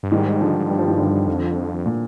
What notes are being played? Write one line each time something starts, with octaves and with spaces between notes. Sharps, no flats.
G2
G#2 D#3 G3
D3 F3
G2 G3
F3
D#3
D3 F3
F2
A#2